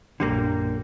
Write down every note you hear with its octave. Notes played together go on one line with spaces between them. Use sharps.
A#1 F#2 D3 G3 A#3